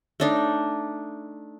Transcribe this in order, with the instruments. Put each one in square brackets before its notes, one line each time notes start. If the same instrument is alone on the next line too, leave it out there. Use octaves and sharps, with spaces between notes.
[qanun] A3 D4 D#4